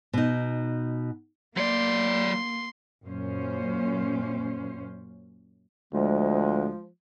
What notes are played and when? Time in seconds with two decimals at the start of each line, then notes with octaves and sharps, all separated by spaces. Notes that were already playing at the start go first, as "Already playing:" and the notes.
0.13 B2 D#4
1.57 F#3 A#3 D5 C6
3.04 F#2 A#2 C#4 C5
5.93 D2 F3 G#3